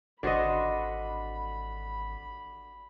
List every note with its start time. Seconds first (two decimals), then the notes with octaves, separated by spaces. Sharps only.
0.23 G#1 D3 F#4 C5 D5 D#5 B5